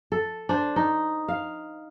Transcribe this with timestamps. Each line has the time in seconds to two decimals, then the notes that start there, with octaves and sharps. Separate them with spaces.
0.12 A4
0.49 D4 C5
0.76 D#4
1.28 F5